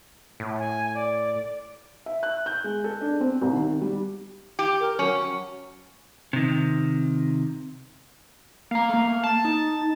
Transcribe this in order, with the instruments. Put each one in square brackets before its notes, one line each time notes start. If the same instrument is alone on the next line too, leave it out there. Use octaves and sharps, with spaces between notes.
[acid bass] A2
[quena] G#5
D5
[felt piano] E5
F#6
G6
G#3
A4
D4
C4
C2
D#3
G3
[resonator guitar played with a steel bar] G4
[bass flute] A#4
[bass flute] F#3 [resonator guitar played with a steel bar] C#4
[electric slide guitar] C3 D#3
[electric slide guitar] A#3 A#5 [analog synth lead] F5
[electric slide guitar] A3 A#3
[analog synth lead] A5
[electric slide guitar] D#4